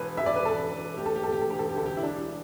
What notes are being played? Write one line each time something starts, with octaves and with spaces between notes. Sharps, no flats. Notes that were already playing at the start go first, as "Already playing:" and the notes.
Already playing: E1 B4
E1 E5
D5
B4
E1 A4
E1
A3 G4
A4
G4
A3 A4
G4
A4
E1 G4
A4
G4
D2 A4
G4
E4
E1 D4